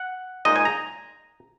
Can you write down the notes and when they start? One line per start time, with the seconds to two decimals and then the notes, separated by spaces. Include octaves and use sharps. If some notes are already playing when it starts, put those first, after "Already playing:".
Already playing: F#5
0.45 A#2 G#3 D#4 D#5
0.56 G#5
0.65 A#5